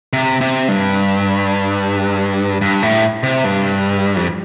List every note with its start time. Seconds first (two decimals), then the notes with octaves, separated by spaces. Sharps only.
0.13 C3
0.41 C3
0.68 G2
2.61 G2
2.83 A2
3.23 C3
3.44 G2
4.17 F2